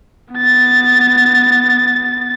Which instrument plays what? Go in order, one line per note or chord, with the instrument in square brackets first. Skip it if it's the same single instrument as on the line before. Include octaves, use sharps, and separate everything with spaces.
[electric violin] B3 A6